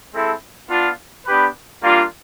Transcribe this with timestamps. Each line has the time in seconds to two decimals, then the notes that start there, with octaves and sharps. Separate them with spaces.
0.12 G#3 C4 E4 A4
0.69 B3 D4 F4
1.25 B3 D4 G4 B4
1.83 G3 A#3 D4 F4